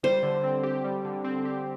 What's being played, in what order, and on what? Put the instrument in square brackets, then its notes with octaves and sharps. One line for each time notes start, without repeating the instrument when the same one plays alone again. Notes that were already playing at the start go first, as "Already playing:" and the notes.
[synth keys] G3 [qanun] C5
[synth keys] D3
C4
G4
G3
D3
C4
G4